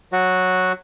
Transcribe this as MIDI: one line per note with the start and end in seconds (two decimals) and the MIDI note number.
0.12 0.72 54
0.12 0.72 66